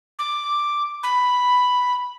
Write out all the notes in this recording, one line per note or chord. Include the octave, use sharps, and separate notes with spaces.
D6
B5